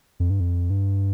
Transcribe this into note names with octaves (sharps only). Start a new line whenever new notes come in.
F2
G2
F2
G2